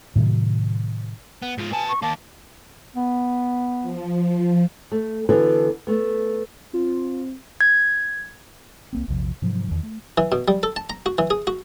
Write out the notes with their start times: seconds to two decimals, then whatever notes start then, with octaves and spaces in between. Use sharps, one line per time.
0.16 A2 C3 D#3 F#3
1.42 B3
1.58 G#2 F4
1.72 B3 G#5 A5
1.89 C#6
2.02 D#3 A#3 A5
2.96 B3
3.82 F3
4.92 A3
5.29 D3 E3 B3 F#4 A4 B4
5.87 A3 B3
6.74 C4 F4
7.61 G#6
8.93 C2 A#3 C4
9.08 A#1 E2 C3 F3
9.42 G#2 C3 F3 F#3
9.69 E2 D#3
9.83 A3
10.18 E3
10.32 B2
10.48 G3
10.63 A4
10.76 A5
10.90 A#5
11.06 F#4
11.18 E3
11.30 G#4
11.47 F#4